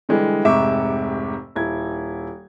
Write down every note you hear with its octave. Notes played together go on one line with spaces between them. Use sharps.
D3 E3 G3 G#3
F1 G#2 C3 E5 C#6 D6
D#1 E4 G#6